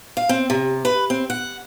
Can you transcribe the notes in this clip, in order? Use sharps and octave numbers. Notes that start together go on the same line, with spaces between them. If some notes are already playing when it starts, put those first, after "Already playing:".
F5
C4
C3
B4
C4
F#5